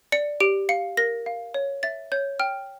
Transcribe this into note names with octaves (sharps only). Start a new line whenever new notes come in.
D5 C#7
G4 D7
F5 C#7
A#4 A#6
F5
C#5
E5 A6
C#5 G6
G5 F6